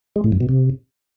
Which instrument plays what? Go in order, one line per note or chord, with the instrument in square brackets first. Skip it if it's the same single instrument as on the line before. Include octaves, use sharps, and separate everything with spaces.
[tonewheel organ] G#3
A2
F#2
B2
C3